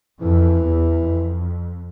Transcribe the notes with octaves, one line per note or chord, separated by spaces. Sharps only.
F2 E3
E2
F2